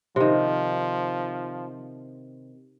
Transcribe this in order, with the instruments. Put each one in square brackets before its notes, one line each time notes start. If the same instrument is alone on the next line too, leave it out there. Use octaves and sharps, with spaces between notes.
[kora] C3 D#3 [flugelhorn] F3